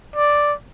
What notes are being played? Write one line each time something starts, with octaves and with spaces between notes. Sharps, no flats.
D5